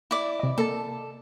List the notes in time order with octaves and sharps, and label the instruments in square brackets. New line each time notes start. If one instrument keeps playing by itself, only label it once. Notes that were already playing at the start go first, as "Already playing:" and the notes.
[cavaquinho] E4 D5
[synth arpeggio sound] C3 D#5
[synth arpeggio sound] A#3 A5 [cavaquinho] A4